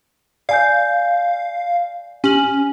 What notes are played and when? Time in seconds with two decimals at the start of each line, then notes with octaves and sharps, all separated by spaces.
0.49 D5 F5 G#5 G6
2.24 C#4 G4 F#7